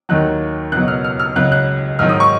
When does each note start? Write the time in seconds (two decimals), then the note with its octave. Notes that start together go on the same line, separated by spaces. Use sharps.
0.09 D#2 D#3 F#3 F#6
0.72 C#2 B2 F#3 F#6
0.88 F6
1.05 F6
1.20 F6
1.36 C#2 C#3 F#3 F#6
1.52 F#6
1.99 G#2 D#3 F#3 F6
2.09 D#6
2.20 C#6